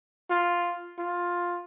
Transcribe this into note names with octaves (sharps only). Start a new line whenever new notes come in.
F4
F4